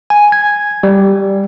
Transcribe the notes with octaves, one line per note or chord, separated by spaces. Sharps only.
G#5
G#6
G3